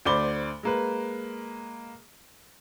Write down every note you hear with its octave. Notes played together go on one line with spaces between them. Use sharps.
D2 C5 D5 B5 D6 G7
G#3 A#3 B4